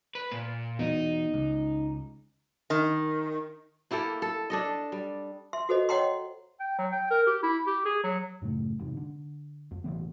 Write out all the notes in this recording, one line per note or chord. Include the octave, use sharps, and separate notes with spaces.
B4
A#2
E2 B2 D#4
C#2
D#3
A#3 E4 G4 A4
A4
D4 A4 D#5
G3
E5 C6
F#4 A4 C5 D#5
C#5 D#5 F#5 G5 A#5 C6
G5
F#3
G5
A#4
G4
E4
G4
G#4
F#3
F#2 A2 C#3 A3
F1 E2 G#2 C3
D3
F2
E1 A1 E3 B3